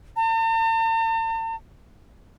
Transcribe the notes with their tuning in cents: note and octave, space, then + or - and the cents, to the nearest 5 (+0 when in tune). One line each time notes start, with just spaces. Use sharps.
A5 +45